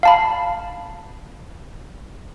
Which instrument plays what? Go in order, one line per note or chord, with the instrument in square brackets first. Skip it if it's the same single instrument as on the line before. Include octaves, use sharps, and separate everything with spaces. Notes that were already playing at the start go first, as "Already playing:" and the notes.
[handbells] F5 A5 B5